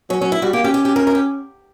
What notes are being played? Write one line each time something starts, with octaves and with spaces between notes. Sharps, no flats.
F#3 C#4
F#3 C#4
E4
G3 F#4
A#3 G4
C#4 G4
G4
G4
A#4
A#4
G4